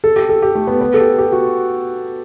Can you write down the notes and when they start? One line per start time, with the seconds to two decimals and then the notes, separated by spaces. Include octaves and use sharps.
0.04 A4
0.16 G4
0.29 A4
0.42 G4
0.55 A3
0.67 B3
0.81 B3
0.94 A4
1.00 G4
1.18 G4
1.32 F#4